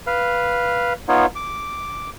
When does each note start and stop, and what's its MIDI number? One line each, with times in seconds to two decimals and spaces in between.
0.07 0.93 71
0.07 0.93 77
1.08 1.26 59
1.08 1.26 63
1.08 1.26 65
1.08 1.26 73
1.36 2.10 86